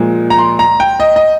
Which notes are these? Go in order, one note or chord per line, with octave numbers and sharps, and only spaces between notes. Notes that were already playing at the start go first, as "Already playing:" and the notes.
Already playing: A#2 F3 G#3
A#5
C6
A#5
G5
D#5
D#5